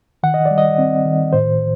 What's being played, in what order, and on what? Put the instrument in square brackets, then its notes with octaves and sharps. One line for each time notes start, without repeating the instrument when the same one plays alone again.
[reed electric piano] D#3 F#5
D#5
D5
G3
D#5
C4
D#3
A2 C5